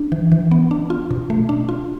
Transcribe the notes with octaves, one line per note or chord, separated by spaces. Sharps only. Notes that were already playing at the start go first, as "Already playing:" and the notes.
Already playing: D4
E3
E3
B3
D4
F4
B2
A3
D4
F4